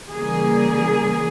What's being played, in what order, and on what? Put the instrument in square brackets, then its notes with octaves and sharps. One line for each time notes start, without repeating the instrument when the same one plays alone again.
[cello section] C#3 E3 G3 A#3 G#4